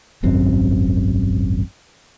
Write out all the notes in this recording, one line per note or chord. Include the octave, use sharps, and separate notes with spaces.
D#1 G#1 F#2 C4